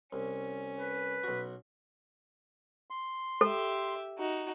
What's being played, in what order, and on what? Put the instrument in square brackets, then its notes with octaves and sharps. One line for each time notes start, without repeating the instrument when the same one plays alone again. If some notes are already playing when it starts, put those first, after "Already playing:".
[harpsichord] C2 [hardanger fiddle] C#4
[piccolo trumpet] B4
[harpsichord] B1 F#4
[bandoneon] C6
[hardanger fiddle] G4 E5 [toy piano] A4
[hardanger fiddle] D#4 F#4